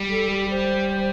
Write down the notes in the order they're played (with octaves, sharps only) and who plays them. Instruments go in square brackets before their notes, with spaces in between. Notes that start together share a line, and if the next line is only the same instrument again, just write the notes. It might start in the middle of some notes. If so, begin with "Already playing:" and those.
Already playing: [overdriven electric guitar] G3
[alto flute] A4
G4
C5